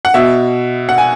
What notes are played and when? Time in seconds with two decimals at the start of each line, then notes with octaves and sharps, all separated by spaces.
0.05 F#5
0.14 B2 E5
0.89 F#5
0.98 G#5